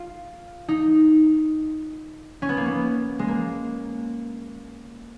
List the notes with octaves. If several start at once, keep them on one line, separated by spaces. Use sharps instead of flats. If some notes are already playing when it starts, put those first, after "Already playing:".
Already playing: F4
D#4
C#4
B3
A#3
B3
G#3
A#3